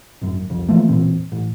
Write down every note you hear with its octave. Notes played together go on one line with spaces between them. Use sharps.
G#1 F#2
C2 F2
E3 F3 A3 A#3
E1 A#2 E3 C4
A1